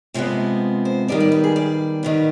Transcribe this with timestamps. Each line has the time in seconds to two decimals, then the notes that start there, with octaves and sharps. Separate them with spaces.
0.14 C3 F3 G#3 B3
0.85 C5
1.08 D#3 G3 B3 D5
1.20 D5
1.32 B4
1.44 G#4
1.56 D5
2.03 D#3 G3 B3